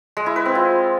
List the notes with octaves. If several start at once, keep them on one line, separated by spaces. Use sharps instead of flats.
G#3
E4
B4
C4
F4